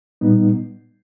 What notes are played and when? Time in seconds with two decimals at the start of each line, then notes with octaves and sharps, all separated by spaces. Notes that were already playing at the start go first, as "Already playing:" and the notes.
0.21 A#2 G3 B3 D#4